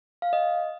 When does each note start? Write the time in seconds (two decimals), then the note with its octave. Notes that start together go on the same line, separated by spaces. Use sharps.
0.22 F5
0.33 D#5